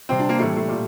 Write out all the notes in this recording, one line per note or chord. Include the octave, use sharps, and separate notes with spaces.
C3 G3 C4
D4
A#3
A2 E3 G3 A3
A3
A#2 G3